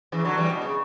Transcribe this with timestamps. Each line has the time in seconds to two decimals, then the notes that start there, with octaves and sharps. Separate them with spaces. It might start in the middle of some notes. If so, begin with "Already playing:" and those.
0.12 C#3 E3
0.25 D3 F#3
0.37 E3 G3
0.50 B2
0.62 C#3